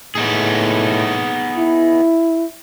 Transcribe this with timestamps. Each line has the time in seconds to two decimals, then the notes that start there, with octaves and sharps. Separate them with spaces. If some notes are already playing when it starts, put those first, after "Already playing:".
0.15 A2 B3 D#4 G#4
1.57 E4